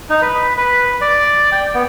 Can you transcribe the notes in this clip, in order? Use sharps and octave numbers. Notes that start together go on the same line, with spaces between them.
D#4
B4
B4
D5
G5
B3